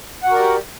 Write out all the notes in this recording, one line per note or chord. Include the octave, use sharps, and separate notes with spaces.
F#4 G4 A#4 D5 F#5